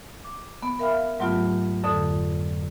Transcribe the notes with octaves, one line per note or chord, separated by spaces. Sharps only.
D6
B3
A#4 E5 F5 G5 B5 F6
G#2 F#3 A3 B3 F4 G4
F2 D3 A4 D#6